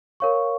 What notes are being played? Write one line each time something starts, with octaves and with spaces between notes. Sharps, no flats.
A#4 C#5 F5 C#6